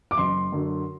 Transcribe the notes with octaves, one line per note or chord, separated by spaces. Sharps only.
D6
F#1 C6
F#2 D3